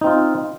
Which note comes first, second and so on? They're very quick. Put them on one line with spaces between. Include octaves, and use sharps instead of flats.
D#4 C4 F4